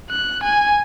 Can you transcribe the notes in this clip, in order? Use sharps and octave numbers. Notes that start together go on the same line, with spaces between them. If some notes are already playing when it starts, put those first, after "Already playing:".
F#6
G#5